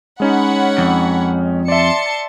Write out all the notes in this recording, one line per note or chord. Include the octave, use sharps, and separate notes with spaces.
G#3 C#4 D#4 C#5 F#5 B5
F2
D5 E5 A5 C6 C#7